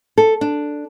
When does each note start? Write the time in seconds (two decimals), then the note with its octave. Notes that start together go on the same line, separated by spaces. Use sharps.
0.18 A4
0.41 D4